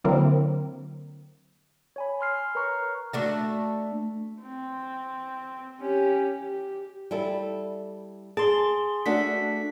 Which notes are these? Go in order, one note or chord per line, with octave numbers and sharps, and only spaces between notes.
D3 F#3 A#3 C4 E4 A#4
C#5 G#5 B5
C6 F6 C7
A#4 B4 C#5 A#5 C#6 F6
A3 D4 F#4
C4
C#4 G4
G4
G3 E4 A4
G#4 A5 C6
A3 D4 F#4 B6